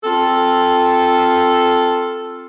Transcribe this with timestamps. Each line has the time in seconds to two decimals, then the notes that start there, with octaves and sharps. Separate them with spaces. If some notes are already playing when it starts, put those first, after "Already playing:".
0.04 C4 F4 A4